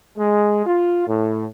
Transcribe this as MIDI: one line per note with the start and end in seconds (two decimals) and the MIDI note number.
0.18 0.64 56
0.66 1.04 65
1.07 1.45 45